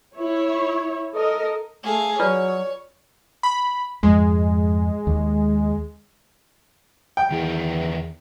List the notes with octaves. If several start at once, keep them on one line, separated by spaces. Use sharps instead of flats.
E4 C#5
A4 A#4 D#5
A3 G#4 F5
F#3 F4 B4 C#5 D5
B5
F2 G#2 G#3
D#2
G5
E2 D#3 E3 A#4